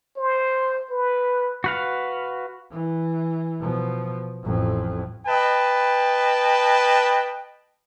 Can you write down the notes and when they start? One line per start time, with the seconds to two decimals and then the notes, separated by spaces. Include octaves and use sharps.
0.17 C5
0.91 B4
1.64 F#4 B4 F5
2.72 E3
3.60 B2 F3
4.43 A1 F2
5.26 B4 D#5 G5 A5